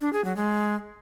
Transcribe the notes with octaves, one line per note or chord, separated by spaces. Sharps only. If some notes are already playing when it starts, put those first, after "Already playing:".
D4
G#4
F#3
G#3